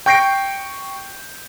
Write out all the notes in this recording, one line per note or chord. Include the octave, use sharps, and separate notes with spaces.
G5 C#6 G6 A#6 C7 D7